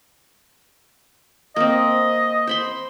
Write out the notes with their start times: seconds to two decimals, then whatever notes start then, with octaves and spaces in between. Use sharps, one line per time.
1.56 A#3 C4 D#5
2.47 C5 B5 C6